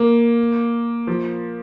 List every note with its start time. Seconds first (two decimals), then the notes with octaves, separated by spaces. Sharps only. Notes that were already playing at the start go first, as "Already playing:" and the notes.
Already playing: A#3
1.07 F3